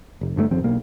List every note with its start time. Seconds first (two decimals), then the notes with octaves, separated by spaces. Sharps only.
0.21 F1
0.36 G1 G2 E3 A3
0.51 D1 G#1 F2 C4
0.64 B1 A#3